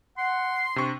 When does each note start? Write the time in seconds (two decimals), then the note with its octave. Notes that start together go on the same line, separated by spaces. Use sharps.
0.18 F#5 C6
0.76 C3 D4 C#6